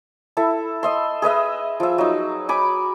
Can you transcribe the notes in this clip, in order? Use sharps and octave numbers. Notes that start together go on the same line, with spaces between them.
E4 A4 E5
D#5 E5 C6
G#4 B4 D#5 E5
F3 E5
F#3 D#4
G#5 B5 D6